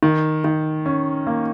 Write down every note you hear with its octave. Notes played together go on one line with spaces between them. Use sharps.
D#3
D#3
C#4
A#3